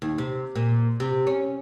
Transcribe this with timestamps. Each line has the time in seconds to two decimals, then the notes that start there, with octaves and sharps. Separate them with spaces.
0.02 D#2
0.18 C3
0.55 A#2
1.00 C3
1.27 C#4